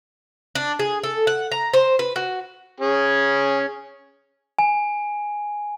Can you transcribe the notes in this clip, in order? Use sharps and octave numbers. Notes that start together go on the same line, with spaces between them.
D4
G#4
A4
F#5
A#5
C5
B4
F#4
C#4 G#4
G#5